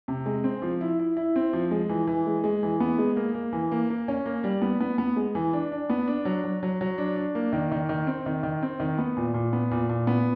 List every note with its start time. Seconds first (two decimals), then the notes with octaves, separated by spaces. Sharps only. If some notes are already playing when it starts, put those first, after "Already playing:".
0.08 C3
0.26 G#3
0.44 C4
0.62 F3
0.81 E4
0.99 E4
1.17 E4
1.36 C4
1.53 F3
1.71 G#3
1.89 E3
2.07 E3
2.26 G#3
2.44 G#3
2.63 E3
2.80 B3
2.98 G#3
3.16 A#3
3.34 A#3
3.53 E3
3.72 A#3
3.90 A#3
4.08 C#4
4.26 A#3
4.44 G3
4.62 B3
4.80 B3
4.98 B3
5.16 G#3
5.35 E3
5.53 D4
5.72 D4
5.90 B3
6.08 D4
6.25 F#3
6.44 F#3
6.63 F#3
6.81 F#3
6.98 D4
7.16 D4
7.35 A#3
7.53 D#3
7.72 D#3
7.89 D#3
8.07 C4
8.26 D#3
8.43 D#3
8.62 C4
8.80 D#3
8.98 B3
9.17 A#2
9.34 A#2
9.53 B3
9.71 A#2
9.89 A#2
10.07 B3